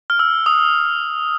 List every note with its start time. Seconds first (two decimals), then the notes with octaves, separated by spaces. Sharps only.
0.10 F6
0.19 E6
0.46 D#6